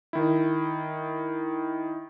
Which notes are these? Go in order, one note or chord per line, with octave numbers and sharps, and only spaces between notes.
D#3 E4